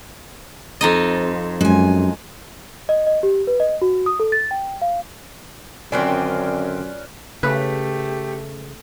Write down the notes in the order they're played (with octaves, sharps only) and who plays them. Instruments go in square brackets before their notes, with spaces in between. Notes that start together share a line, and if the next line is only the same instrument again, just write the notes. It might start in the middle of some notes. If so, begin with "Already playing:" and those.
[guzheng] F2 D#4 D#5
[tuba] F#2 [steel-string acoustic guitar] G#3 G#5
[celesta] D#5
D#5
G4
B4
D#5
F#4
D#6
A4
A6
G5
F5
[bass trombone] F#2 [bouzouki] D3 D#3 C4 [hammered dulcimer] C#4 F4 B4 [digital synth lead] D5
[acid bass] C#3 [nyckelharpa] A3 [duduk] G4 [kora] B4